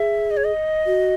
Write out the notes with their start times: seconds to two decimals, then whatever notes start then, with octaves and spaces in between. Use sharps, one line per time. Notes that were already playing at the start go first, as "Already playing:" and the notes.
Already playing: G#4 E5
0.30 D#5
0.37 C#5
0.44 D#5
0.86 F#4